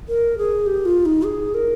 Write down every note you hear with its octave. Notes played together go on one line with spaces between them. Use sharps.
A#4
G#4
G4
F4
D#4
G#4
A#4